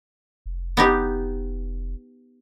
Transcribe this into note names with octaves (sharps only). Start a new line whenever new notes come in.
F1
B3 D#4 G4